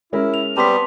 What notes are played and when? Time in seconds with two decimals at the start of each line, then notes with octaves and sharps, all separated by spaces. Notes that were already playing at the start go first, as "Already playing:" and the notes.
0.13 G#3 C#4 E4 A#4
0.34 F7
0.57 G3 B3 C4 G4 A5 C6 B6